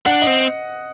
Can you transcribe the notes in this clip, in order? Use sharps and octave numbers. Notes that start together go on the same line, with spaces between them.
D4 F#5
C4 D#5